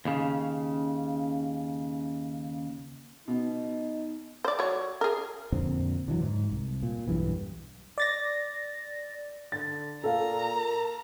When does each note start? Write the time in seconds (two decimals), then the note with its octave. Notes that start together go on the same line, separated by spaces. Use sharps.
0.05 D#2 C#3
3.28 B2 D#4
4.45 C5 D5
4.59 F#3 C#5
5.01 G#4 A#4
5.52 F2 A#2 D3 C4
6.08 D3 E3 F#3
6.22 G#2
6.51 C2
6.83 A#2
7.08 B1 E2 G2 E3
7.98 D5 A6 A#6
9.52 D3 A6
10.04 A#2 A4 F5 A#5
10.56 A#4